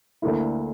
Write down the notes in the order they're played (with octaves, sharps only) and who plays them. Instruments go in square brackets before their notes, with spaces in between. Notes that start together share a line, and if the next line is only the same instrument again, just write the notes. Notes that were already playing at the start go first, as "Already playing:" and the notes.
[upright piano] D2 D3 A#3 E4